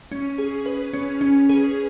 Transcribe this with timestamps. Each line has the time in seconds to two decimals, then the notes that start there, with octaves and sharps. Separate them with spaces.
0.12 C#4
0.38 G#4
0.66 B4
0.93 C#4
1.21 C#4
1.49 G#4